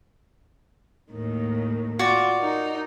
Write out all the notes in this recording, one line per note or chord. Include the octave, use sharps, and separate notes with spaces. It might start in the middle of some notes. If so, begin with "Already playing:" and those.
D#2 A2 D#3
F4 F#4 D5
D#4 A#4